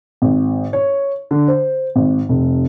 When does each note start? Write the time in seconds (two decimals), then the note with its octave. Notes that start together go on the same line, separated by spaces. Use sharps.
0.22 G#1
0.73 C#5
1.31 D3
1.48 C5
1.96 G#1
2.29 F1